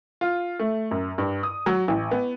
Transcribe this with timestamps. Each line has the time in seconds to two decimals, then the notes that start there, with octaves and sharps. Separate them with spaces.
0.21 F4
0.59 A3
0.91 F#2
1.18 G2
1.43 D#6
1.66 F#3
1.88 A1
2.11 B3